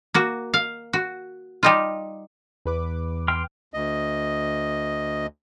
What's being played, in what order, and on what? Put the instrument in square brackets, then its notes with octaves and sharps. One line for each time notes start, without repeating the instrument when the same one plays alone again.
[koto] A#3 F#4
F5
F#4
G3 D#4 F4
[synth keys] E2 B4 D6
[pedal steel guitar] G5 C6 F6
[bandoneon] D2 D#5